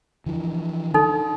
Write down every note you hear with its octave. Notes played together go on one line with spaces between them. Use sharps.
D3 E3 F3
D3 D#4 A4